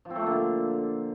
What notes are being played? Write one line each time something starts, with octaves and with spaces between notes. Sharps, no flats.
F3
C4
A3
A#3
D3